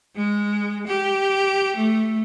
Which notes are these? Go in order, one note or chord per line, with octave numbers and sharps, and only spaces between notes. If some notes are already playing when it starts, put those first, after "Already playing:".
G#3
G4
A3